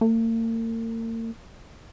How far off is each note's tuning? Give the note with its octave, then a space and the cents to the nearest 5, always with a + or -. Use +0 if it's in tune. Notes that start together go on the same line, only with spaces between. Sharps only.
A#3 -45